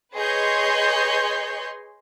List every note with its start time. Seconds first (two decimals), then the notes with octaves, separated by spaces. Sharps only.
0.15 G#4 B4 C#5 D#5 C6 G6